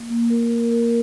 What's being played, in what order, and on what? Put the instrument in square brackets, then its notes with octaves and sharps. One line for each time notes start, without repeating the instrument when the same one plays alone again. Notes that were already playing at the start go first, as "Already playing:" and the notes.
Already playing: [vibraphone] A#3
A#3
A#4
A#4
A#4